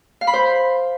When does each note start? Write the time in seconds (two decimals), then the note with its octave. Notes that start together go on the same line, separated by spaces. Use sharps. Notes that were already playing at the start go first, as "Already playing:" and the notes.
0.21 F5
0.27 B5
0.33 C5